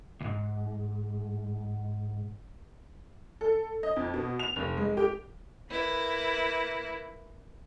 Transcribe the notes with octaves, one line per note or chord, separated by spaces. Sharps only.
C#2 G#2
A4
D#5
F2
B2
F7
F1
G#3
G4
A#3 E4 B4